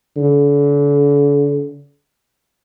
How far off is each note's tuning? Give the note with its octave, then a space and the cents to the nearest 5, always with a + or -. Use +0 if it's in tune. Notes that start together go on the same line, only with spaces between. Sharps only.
D3 -40